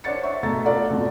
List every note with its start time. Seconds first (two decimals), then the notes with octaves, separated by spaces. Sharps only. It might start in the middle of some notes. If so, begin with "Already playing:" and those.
0.04 D4 C5 C#5 F#5 A6 C#7
0.23 E5 C#6
0.43 B2 A3 A#5 A6
0.65 D4 F4 A4 D5 F#5 A#5
0.90 F2 B2 A3 F#4